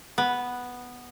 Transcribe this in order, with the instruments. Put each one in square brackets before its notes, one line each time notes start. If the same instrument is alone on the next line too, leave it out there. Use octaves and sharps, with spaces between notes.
[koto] B3